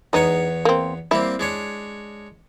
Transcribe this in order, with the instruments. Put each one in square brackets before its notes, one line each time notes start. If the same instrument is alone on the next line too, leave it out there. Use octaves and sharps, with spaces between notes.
[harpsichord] E2 B3 C#5 [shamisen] G#3 D#4
[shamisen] A#3 C4
[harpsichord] G3 A#3 C4 [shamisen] E4
[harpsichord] G#3 D4 C#5